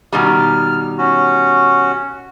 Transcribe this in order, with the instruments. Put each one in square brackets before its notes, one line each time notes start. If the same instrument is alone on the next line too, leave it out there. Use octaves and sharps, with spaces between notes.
[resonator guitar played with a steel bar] B2 D#3 G3 [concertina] F6
[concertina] C#4 F#4